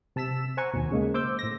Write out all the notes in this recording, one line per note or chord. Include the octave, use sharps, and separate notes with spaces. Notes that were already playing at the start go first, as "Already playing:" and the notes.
C3 A5 E6 B6 E7
C5 F#5 G#5 A#5 C#6
D#2 B2
C#3 G#3 A#3
C5 D6 E6 G6
A2 A#6